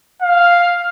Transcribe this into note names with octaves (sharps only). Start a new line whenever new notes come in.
F5